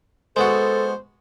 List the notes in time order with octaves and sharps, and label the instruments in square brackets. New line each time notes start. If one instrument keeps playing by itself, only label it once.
[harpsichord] G#3 B3 F#4 [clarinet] A4 [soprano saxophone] C5